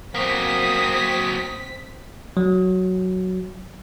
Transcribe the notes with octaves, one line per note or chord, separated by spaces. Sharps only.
F#3 A#3 C4 D#6 B6
F#3